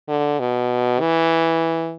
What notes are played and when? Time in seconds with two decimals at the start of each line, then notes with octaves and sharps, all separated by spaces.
0.09 D3
0.40 B2
1.00 E3